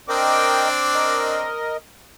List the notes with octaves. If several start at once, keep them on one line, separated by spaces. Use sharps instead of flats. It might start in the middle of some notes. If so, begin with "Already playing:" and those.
C4 D4 A#4 D#5 G5 D6
A#4 D#5